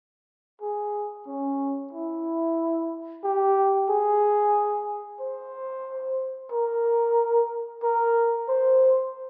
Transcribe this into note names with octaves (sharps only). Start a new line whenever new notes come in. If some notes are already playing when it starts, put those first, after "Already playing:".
G#4
C#4
E4
G4
G#4
C5
A#4
A#4
C5